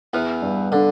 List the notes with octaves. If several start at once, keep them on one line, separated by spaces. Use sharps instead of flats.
E2 E3 B3
G2
D3 D4